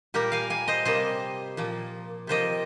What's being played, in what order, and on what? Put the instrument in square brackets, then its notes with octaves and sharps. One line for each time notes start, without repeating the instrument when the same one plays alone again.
[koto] A#2 G3 A#3 G4 A#4
F5 G#5
F5 G#5
C5 D#5
C3 G3 A#3 C5 D#5
A#2 F3 A#3
C3 F3 A#3 C5 D#5